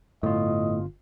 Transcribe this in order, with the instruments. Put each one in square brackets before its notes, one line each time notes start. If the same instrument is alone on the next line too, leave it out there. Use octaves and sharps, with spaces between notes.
[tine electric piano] G1 F4 [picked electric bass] A2 [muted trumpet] D#5